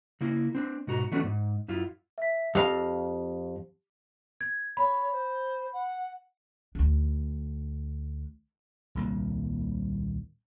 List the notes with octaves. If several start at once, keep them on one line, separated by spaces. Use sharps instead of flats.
C#3 A#3 E4
C4 D4
G#2 B2 F#4 A#5
E3 F#3 A3 B3 C#4 D4
G#2
F#2 E4 F4
E5 B6
F2 G4 F5
G#6
C#5 B5
C5
F#5
D2 D4
D#1 C2 A#3